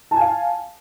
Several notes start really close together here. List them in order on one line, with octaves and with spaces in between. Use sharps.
A5 G#5 F5